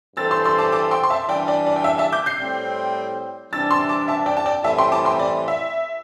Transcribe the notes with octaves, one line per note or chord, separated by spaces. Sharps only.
G2 E3 C4 A4 C5 E6 A6
C6 E6
C6 E6
A5 D6
A5 D6
G5 C6
C6
E5 A5
E3 G3 D4 D5 G5
D5 G5
D5
G5
E5
E5 A5
D6 G6
G6 C7
A2 G3 C4
C3 E3 G3 D4 E6 A6
C6 E6
A5 D6
E5 A5
D5 G5
A5
D5 G5
A2 E3 G3 C4 E4 E5 A5
G5 C6
A5 D6
G5 C6
D5
E5